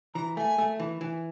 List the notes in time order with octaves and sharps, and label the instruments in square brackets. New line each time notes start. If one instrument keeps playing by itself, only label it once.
[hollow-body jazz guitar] E3 [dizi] A#5
[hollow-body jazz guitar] A3 [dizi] G#5
[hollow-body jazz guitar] A3
E3
E3